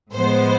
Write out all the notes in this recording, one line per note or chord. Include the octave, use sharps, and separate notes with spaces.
A2 F3 G#3 B3 C5